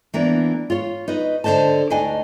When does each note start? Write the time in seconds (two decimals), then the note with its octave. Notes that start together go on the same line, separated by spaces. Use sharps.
0.14 E3 A#3 B3 D4
0.70 F4 C#5
1.08 D#4 B4 D#5
1.44 D3 G#4 C5 D#5 A5
1.90 D2 D4 D#4 D#5 G#5